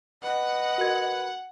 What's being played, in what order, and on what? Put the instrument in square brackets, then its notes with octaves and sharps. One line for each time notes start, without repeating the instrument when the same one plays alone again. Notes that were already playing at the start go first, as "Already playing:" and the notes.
[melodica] B4 [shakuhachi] D#5 [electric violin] F#5
[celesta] F#4 A#4 G#6